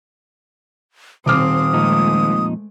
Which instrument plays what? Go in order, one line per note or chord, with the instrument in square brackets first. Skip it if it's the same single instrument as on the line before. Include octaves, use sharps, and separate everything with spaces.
[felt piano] D#1 D6 F6 [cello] C4 [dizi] D#6
[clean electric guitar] F2 A#2 D#4 [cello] G#3 A3